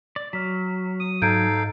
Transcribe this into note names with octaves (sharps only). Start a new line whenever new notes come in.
D5
F#3 F6 B6
D#6 D#7
G#2 D#4 A4 F5 G6 G#6 D7